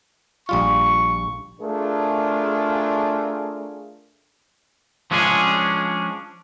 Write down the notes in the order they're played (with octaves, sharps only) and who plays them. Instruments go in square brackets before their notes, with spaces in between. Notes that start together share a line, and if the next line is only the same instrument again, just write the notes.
[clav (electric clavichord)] A#1 G3 F4 [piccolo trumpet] C#6
[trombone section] A3 D4 F4 G#4 A#4
[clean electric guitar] F3 G#3 C#4 D4 G#4